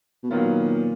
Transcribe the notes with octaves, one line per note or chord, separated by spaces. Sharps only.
B2
A#2 D#3 F#3 B3 F4